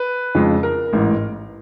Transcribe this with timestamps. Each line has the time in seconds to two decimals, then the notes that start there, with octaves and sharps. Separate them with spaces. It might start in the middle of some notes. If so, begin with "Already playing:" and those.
Already playing: B4
0.35 F2 C#3 F3 G#3
0.63 A#4
0.93 A1 G#2 E3